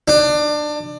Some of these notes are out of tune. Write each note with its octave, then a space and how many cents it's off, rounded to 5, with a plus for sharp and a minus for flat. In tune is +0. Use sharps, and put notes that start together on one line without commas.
D4 +25